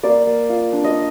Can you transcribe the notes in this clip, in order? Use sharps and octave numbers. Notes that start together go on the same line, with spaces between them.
A#3 D5
A#3
F4
D4
D#5